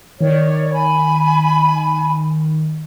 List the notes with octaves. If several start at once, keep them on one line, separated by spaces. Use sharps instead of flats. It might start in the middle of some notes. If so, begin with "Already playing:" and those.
D#3 C#5 D5
G#5 B5